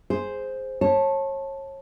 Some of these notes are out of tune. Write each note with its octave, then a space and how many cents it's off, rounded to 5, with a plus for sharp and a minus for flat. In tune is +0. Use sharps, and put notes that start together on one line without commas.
G#4 +0 C5 +0
C#5 -30 A5 +0